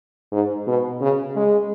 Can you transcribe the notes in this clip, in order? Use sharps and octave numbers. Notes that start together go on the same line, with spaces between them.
G#2
B2
C#3
G#3